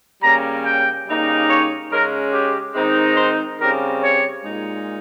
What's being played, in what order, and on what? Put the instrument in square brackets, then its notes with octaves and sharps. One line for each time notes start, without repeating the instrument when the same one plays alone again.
[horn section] C#3 G3 A#3 C#4 A#5
G5
C#3 G3 A#3 D#4
C#5
C#3 G#3 C#4 A#4
G4
D#3 G#3 C4 D#4
C5
C#3 G3 C4 A#4
C#5
A#2 G#3 D#4